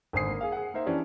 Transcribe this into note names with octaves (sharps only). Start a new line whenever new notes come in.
G#1 D3 C5 G#5 D#6 C7
A#3
G#4 F5
G#4 F#5
A#3 D#4 A#4 C5 E5
E3 C#4 D4 G4 D5